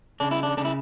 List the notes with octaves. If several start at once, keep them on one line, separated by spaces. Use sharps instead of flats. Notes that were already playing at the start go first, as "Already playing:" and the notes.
C#3 D4
E4
D4
C#3 D4
E4